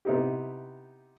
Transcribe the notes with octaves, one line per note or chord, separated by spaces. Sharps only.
C3 B3 D#4 E4 G4